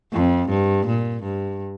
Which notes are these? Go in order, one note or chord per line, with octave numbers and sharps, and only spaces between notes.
F2
G2
A#2
G2